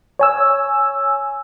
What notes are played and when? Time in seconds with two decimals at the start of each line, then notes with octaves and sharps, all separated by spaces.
0.19 C#5 G#5 E6